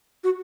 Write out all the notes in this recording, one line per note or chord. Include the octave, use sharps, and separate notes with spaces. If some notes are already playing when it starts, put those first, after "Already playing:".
F#4